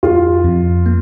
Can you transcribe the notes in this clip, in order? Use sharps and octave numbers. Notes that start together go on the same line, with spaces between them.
F2 F4
F2
A#3